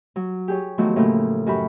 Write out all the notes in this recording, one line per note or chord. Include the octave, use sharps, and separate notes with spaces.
F#3
G4 G#4 C#5
D#3 F3 F#3 A3 B3 F#4
A2 C#3 F3 A3 A#3
F#2 F#4 G4 B5